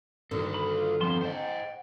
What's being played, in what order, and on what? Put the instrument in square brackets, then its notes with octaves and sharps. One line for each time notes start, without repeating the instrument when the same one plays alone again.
[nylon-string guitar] G2 D3 D#3 [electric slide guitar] F#4 A4
[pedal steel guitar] B5
F4
[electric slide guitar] F3 C4 [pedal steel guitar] B3 A5 C6
[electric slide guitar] C5 D#5 [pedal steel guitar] F#5 G5